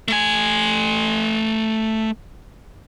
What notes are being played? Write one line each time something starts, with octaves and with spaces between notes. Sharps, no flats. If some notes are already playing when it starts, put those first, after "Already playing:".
A3 G#5